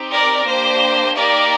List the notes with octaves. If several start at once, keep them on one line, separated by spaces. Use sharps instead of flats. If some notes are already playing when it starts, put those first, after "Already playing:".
Already playing: C4 D#4 G4
A#4 D5
A#3 D4 G4 C5
A#3 D#4 G4 A#4 D5